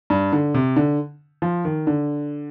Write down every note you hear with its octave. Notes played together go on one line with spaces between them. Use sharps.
G2
D3
C3
D3
F3
D#3
D3